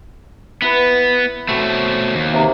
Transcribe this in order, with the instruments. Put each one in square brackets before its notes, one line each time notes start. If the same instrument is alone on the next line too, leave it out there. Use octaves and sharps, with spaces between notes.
[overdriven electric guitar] B3 [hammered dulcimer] E4 B4
[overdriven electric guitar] B2 A3 [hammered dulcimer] C4 F#4 C#5
[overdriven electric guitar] D#2
[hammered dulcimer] C3 A#3 D#4